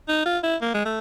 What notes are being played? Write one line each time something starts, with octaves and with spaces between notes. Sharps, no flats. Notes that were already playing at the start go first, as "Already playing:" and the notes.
D#4
F4
E4
A#3
G#3
A3